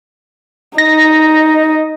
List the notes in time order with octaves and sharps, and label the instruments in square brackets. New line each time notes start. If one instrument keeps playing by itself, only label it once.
[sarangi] D#4 [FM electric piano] A#6